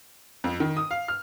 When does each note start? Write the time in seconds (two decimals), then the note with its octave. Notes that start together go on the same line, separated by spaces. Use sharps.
0.44 F2
0.60 D#3
0.77 D#6
0.91 F5
1.08 F6